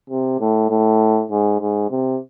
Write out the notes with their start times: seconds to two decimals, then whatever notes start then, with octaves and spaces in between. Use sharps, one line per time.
0.10 C3
0.40 A2
0.70 A2
1.30 G#2
1.60 G#2
1.91 C3